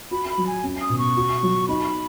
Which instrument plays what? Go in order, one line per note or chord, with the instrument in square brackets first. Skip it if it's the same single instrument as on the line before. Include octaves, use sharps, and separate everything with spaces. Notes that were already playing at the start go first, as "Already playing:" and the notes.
[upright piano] F#4 [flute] B5
[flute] B5
[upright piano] F#3
[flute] G#5
[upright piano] C#4
[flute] D#6
[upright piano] B2
[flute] C#6
[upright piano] F#4
F#3
[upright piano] D#4 [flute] B5